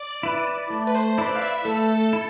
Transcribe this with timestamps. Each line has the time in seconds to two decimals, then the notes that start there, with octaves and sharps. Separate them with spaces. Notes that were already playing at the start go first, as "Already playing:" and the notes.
Already playing: D5
0.23 E4 B4
0.70 A3
0.87 B4
0.95 C5
1.18 E4 B4 D5
1.36 F5
1.42 E5
1.65 A3 A4
2.13 E4